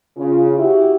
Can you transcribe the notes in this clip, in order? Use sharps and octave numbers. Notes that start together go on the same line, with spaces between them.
C#3 F4
E4 F#4 G4